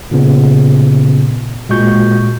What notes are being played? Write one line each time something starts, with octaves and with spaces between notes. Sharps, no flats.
A#2 C#3 B3
A#2 G#3 F#4 C#6 G6